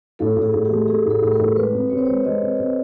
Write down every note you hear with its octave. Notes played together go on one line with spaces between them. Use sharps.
A2 A4
A2
G#4
A2
A3 G4
A3 G#4
A2
A4
A2
A#4
A2
G#3 B4
C3
C3 C#5
C5
G#3 C#5
G#3 D#5
C3
C3